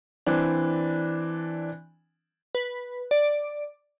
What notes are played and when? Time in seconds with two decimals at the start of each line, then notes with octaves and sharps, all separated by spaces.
0.26 E3 C4 D4
2.55 B4
3.11 D5